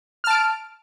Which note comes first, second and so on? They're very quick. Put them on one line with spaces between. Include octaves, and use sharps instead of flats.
F6 A5 D7